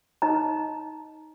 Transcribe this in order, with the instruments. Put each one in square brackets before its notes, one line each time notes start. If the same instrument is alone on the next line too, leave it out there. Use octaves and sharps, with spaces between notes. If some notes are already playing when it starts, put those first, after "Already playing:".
[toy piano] D#4 D#5 A#5